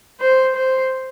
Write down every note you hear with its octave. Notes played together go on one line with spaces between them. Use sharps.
C5
C5